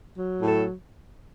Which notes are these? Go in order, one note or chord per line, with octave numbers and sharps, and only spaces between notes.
F#3
A2
A4